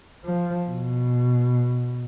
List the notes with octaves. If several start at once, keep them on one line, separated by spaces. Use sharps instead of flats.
F3
B2